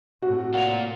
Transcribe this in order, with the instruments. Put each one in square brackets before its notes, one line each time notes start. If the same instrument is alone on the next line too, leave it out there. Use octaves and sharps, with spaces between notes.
[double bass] A2 C3 [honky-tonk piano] F#4
[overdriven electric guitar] A#3 F4 [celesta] F#5 F7